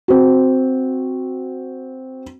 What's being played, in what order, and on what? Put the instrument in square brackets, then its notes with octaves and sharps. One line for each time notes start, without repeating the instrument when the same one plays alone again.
[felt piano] C4 F#4